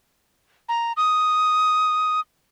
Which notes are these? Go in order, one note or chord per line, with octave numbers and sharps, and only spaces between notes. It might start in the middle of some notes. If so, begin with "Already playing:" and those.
A#5
D#6